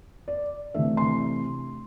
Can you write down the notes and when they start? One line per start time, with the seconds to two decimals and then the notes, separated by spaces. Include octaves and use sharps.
0.28 D5
0.74 C3 E3 A3 D4 E5
0.97 C6